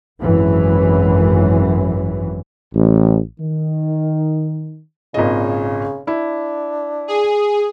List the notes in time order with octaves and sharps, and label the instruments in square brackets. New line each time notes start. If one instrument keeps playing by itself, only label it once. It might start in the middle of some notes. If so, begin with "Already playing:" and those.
[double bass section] G#1 F#2 E3
[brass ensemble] A1
D#3
[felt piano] G#1 A#2 D#5 [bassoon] C#3
[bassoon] D4 [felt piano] E4
[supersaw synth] G#4